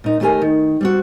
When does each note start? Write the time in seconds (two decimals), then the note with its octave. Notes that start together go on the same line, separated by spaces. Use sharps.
0.04 A#2 D#4
0.20 D#2 A3 B3 G4 A#4 G#5
0.42 D#3
0.81 G3 C4 F#4